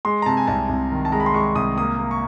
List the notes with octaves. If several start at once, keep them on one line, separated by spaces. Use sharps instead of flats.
G#3 C6
A#5
C3 A5
G#5
C2 A5
C2
D#3
A5
G#3 A#5
B5
C6
G#3 C#6
C2 D#6
A#3 D#6
A#3
C#6